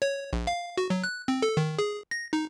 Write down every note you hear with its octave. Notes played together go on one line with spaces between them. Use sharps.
C#5
A#1
F5
F#4
F#3
F#6
C4
A4
D#3
G#4
A#6
D#4